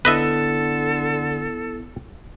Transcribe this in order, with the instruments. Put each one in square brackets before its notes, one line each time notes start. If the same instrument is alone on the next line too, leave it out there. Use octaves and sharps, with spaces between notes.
[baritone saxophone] D3 [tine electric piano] B3 E4 [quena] A4 [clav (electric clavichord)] B4 D#5 E5